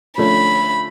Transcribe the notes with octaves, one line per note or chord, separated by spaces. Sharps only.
D3 F3 A3 C#4 B5